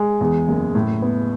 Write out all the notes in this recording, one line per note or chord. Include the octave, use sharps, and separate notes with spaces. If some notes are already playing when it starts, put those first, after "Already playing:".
Already playing: G#3
E2
F#1
A2
B3